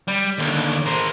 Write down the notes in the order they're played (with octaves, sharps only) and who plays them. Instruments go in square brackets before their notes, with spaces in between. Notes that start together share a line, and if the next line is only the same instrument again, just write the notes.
[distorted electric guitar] G3
D#2 D3
A#4 C5